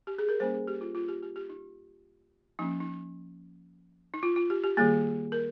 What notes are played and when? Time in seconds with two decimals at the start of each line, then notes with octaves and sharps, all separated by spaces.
0.07 G4
0.18 G#4
0.29 A#4
0.40 G3 A#3 C#4 C5
0.54 G#4
0.68 G4
0.81 F4
0.95 F4
1.09 G4
1.22 G4
1.36 G4
1.49 D#4
2.59 F3 A#3 C#4 D#4
2.80 D#4
4.14 D#4
4.23 F4
4.36 F4
4.50 G4
4.64 G4
4.77 D#3 G3 A#3 G#4
5.32 A#4